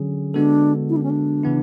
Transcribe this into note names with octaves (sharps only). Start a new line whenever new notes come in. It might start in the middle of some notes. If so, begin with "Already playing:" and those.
Already playing: D3 F#3 C#4 G#4
D3 G#3 B3 D4 F#4 A4
E4
D4
C#4
D4
C#3 E3 B3 E4